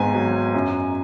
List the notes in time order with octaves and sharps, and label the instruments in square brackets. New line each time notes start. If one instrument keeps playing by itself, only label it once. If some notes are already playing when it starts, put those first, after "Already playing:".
Already playing: [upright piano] G#1 G#2 B3 G#5
F#3
F#2